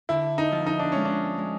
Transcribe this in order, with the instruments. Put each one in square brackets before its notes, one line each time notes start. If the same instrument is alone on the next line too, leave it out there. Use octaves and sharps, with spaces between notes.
[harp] D3 [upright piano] E4
[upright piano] D#4
[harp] F3
[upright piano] D#4
D4
[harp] G#3 [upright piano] C#4
[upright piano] D4
[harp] G#3